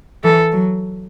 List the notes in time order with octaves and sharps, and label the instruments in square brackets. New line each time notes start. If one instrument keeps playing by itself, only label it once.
[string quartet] E3 [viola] A4
[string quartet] F#3